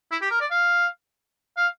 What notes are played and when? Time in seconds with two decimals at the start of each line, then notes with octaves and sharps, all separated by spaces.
0.12 E4
0.22 G4
0.31 A#4
0.40 D5
0.51 F5
1.57 F5